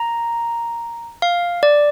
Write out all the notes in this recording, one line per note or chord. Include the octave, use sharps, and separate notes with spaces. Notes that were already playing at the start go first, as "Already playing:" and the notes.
Already playing: A#5
F5
D5